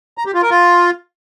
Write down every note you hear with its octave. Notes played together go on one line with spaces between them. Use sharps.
A#5
G4
F4
A#4
F4